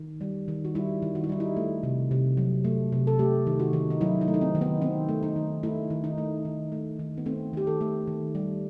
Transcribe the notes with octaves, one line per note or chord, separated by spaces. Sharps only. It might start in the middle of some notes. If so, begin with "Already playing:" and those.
Already playing: D#3
G3
D#3
F#4
G3 E4
D#3
F#4
E4
G3 D#4
E4
A3
C3
C3
F#3
A3
C3
A4
A3 G4
D#3
F#4
D#3
D#4
F#3 E4
D#4
A3
D#4
C4
D#3
B3
D#3 C4
A3
D#4
D#3
A3 E4
D#3
D#4
A3
D#3
A3
D#3
B3
A3 C4
D#3 G4
A4
A3
D#3
G3